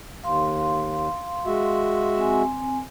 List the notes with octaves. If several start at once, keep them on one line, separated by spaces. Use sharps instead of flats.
D#2 F5 C6
G#3 F#4 E5
C4 G#5